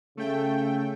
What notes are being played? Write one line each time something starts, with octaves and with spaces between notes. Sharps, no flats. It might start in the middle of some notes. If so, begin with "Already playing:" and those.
C#3 A3 G5